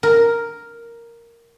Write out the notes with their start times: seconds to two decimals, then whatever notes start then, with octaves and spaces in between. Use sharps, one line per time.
0.03 A#4